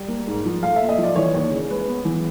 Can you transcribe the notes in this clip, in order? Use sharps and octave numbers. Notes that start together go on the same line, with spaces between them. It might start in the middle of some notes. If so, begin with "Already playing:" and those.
Already playing: G3
A#3
G#2
F3
A3 F5
A#2 E5
D#5
F3
D5
E3 C#5
D#2 C#5
C#3
G#3 B4
B3
E3